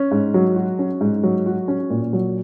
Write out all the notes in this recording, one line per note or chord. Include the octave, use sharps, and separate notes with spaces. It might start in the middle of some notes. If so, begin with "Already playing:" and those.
Already playing: C#4
G#2
F#3
F#4
C#4
G#2
F#3
F#4
C#4
A#2
F#3